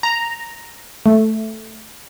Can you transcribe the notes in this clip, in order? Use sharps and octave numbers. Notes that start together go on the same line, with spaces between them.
A#5
A3